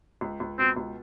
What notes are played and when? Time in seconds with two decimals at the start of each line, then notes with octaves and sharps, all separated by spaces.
0.21 C#2
0.40 C#2
0.59 B2 C4
0.76 C#2